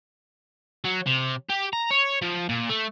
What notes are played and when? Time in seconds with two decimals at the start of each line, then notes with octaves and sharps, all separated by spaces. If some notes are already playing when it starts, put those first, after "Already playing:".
0.85 F#3
1.07 C3
1.50 G4
1.73 A#5
1.91 C#5
2.22 F3
2.49 A#2
2.69 A3